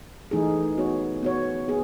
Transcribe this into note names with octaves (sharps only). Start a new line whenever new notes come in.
E3 A3 D#4 G#4
B3 F#4 C#5
B3 F#4 C#5
B3 G#4